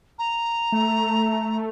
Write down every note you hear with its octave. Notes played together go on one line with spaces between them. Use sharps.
A#5
A3